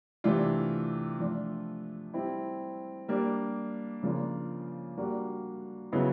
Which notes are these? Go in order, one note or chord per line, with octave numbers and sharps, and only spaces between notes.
C3 E3 A3 D4 F4
F3 A3 D4 F4
G3 C4 E4
G3 A#3 D4
C#3 F3 A#3 D4 F4
G3 A#3 D4 F#4
C#3 F#3 B3 E4